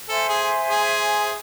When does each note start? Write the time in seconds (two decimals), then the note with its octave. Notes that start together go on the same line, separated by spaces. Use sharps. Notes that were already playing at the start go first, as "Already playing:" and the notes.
0.08 A4 C5 E5 G#5 C6
0.29 G#4
0.70 G#4